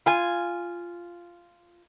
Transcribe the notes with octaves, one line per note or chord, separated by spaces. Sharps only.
F4 G#5